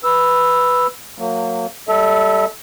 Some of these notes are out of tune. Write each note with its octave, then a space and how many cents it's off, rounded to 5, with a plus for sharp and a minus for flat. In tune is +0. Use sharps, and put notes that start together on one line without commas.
B4 +0 E6 +0
F#3 -30 A#3 -30
G3 +0 A4 +0 E5 -30